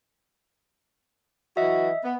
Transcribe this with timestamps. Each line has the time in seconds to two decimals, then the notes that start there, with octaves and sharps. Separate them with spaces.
1.57 E3 F#3 F#4 D#5 E5
2.04 B3